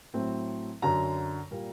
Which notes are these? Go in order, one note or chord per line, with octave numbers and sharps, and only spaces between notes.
A2 F#3 A3 C4
F#2 D3 F#3 A#5
A#2 G3 A#3